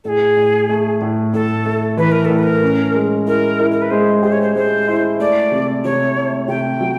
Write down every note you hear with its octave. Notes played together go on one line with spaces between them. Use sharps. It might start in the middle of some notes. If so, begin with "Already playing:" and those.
A2 G#4 A4
A2
A3
A2
A2 A4
A3
E3 B4
A#4
A2 A4
B4
A#4
C#4
G#3
E4 A#4
E4
A#4
B4
G#3 C5
G4 C5
C#5
C5
G#3 C5
E4
A3 D5
C3
C3 C#5
A3
C3 G5
F#3